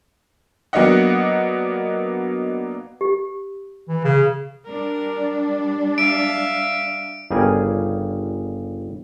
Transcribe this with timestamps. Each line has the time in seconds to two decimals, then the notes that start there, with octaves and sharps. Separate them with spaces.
0.73 F#3 A#3 B3 D4 D#5 F#5
3.01 G4
3.88 E3
4.05 C#3
4.65 G3 D4 A#4
5.98 E5 F5 D7
7.31 G1 C#3 G3 G#4 A#4 G#5